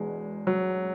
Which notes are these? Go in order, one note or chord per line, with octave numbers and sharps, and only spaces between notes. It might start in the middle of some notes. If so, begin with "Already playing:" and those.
Already playing: E1 E2 B2 G#3
F#3